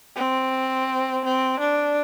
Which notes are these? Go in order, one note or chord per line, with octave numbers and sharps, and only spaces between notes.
C4
C4
D4